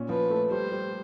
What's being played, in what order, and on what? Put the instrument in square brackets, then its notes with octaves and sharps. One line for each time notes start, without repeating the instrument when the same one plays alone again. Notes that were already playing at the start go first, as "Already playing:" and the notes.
Already playing: [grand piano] A#2 C#4
[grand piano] F3 [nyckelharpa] B4
[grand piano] A3
[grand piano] G3 [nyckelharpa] C5
[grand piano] G3